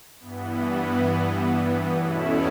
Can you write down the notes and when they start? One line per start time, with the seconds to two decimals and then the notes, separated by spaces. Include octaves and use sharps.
0.20 G2 E3 B3
2.00 E2 B2 A3 C#4 E4